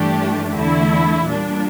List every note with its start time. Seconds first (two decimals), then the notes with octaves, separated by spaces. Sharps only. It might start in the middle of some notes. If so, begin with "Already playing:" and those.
Already playing: G2 E3 A3 D4 G4
0.53 E2 D3 A3 E4
1.26 A#2 G3 D4